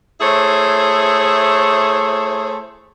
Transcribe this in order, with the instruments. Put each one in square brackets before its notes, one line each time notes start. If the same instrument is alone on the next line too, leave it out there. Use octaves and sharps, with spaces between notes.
[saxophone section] A3 E4 G#4 C5 C#5